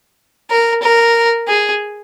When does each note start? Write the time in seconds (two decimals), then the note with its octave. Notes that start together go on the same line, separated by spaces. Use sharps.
0.50 A#4
0.82 A#4
1.47 G#4